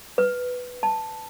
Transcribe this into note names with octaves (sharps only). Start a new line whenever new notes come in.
B4
A5